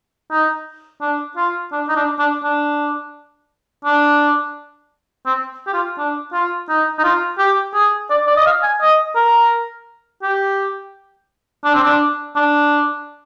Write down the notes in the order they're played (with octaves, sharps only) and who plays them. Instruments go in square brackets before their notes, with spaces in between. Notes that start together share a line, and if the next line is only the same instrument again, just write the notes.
[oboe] D#4
D4
F4
D4
D#4
D4
D4
D4
D4
C4
G4
F4
D4
F4
D#4
D#4
F4
G4
G#4
D5
D5
D#5
F5
G#5
D#5
A#4
G4
D4
C4
D4
D4